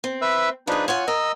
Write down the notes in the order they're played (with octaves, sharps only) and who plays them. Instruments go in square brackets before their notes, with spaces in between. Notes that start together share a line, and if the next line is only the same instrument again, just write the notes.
[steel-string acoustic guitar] C4
[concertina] B4 E5 E6
[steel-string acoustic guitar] F3 G#4 [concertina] D4 D#4 B4
[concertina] F4 [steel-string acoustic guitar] C#5 F#5 G#5
[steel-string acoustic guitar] A#4 [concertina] D#5 E6